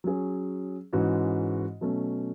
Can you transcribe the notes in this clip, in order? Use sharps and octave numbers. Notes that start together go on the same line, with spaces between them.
F#3 C#4 G#4
G#2 E3 G#3 C#4 F#4
B2 F#3 A3 C#4